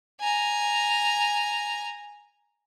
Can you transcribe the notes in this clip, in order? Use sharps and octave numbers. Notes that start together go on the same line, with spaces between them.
G#5 A#5